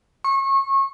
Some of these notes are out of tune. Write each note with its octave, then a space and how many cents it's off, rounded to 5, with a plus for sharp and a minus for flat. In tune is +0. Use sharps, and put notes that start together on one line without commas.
C#6 -30